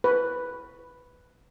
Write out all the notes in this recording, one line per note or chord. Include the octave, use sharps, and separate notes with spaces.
B4